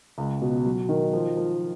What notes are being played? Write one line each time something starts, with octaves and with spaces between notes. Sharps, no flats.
C#2
B2
F#3
D#3
F3
F3